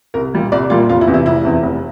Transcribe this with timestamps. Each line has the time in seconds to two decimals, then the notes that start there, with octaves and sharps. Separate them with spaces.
0.14 C2 A#4
0.33 A#2 G3 A#3
0.52 C2 D5
0.70 A#2 G3 A#3 F4
0.89 F1 F4
1.01 E4
1.07 E2 C3
1.14 E4
1.26 F1 E4
1.45 E2 C3
1.63 F1